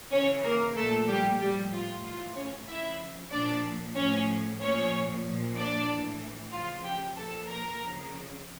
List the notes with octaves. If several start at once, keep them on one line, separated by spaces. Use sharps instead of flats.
C#3 E3 C#4 C#5
A#3 A#4
A#2 F3 A3 A4
G3 G4
A2 F3 G3 G4
F4
A2 E3 F4
C#4 C#5
C#3 F3 E4 E5
A#2 F3 D4 D5
A2 F3 C#4 C#5
A#2 F3 C#4 C#5
A#2 F3
D4 D5
A2 E3
C#3 F3 F4 F5
G4 G5
A#2 F3 A4 A5
A#4 A#5
C#3 F3